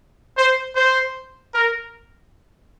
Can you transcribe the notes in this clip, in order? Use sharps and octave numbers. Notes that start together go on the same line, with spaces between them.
C5
C5
A#4